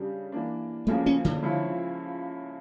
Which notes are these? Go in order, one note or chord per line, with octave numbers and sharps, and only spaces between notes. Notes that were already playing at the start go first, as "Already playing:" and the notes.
Already playing: C#3 G3 D4 G4
E3 A#3 D4
D2 C#3 F3 A3 A#3
C#4
D3
C#2 C#3 F3 C#4 E4